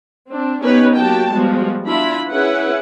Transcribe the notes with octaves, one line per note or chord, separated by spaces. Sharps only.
C4 D4
B3 C#4 D#4 G4 B4 C#5
F#3 A#3 F#4 G4 G5 A5
F3 G3 G#3 B3 F#4
D4 E4 F4 B5
C#4 E4 G#4 B4 F#5